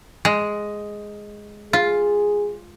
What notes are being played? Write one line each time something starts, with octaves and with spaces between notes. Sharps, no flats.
G#3
F4 G#4